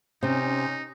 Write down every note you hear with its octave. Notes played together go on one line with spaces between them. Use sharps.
C3 C#4 D#4